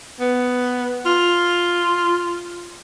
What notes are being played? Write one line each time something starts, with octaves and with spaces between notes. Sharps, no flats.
B3
F4